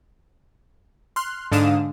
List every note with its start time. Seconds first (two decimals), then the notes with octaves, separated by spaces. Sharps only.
1.16 C6 F6 F#6
1.52 G#2 D3 D4 F5 D#6 E7